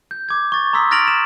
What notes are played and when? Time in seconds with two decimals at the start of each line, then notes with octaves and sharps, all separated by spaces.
0.11 G6
0.29 D6 G#6
0.52 C#6 A6
0.73 A#5 C6 D#6 E6 B6
0.91 F6 A6 A#6 D7 F7 F#7
1.08 E7